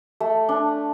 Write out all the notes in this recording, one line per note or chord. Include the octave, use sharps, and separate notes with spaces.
A3
D4